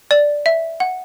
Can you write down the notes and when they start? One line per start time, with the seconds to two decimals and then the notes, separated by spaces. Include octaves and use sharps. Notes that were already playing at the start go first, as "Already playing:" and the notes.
0.11 D5
0.46 E5
0.80 F#5